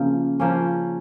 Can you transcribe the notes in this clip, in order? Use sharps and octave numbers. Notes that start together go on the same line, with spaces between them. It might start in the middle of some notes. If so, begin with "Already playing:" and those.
Already playing: C#3 F3 A#3
F3 A#3 C#4